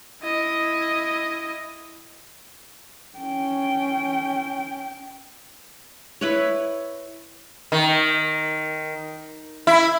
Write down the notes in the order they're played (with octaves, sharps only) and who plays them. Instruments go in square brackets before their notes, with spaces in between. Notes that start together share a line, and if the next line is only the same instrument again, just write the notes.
[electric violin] E4 D#5
[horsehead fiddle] C#4 G5
[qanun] E4 B4 C#5
[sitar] D#3
E4